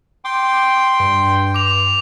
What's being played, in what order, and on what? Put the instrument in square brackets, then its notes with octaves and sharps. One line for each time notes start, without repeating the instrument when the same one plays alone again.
[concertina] G5 C6 [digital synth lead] D6
[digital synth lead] G2
[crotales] D6 F7